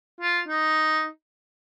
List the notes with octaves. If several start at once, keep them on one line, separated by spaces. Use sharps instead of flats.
F4
D#4